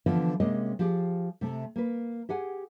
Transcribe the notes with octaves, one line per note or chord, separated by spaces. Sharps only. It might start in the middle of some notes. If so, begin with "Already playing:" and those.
D3 E3 F3 B3 E4 F4
C3 G#3 A#3 C#4 D#5
F3 G4 G#4
C3 A3
A#3 B4
G4 G#4 F#5 G#5